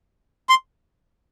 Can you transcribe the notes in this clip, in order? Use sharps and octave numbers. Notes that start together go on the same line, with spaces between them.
C6